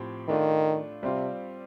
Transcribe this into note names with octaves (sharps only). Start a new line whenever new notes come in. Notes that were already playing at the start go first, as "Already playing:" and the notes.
Already playing: A2 F3 C4 G4
D#3 A3 D4 F4
C3 G3 C4 F4